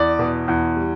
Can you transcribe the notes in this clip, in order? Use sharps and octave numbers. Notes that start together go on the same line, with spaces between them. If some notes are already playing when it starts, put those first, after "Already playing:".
Already playing: E2 D5
B2
E2
G3